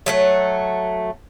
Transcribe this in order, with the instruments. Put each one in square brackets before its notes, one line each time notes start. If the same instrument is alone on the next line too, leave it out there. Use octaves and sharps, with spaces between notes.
[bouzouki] F#3 A3 F#5